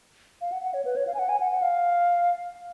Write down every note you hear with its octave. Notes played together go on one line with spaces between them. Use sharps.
F5
F#5
F#5
C#5
B4
C#5
F5
G#5
F#5
G#5
F#5
F#5
F5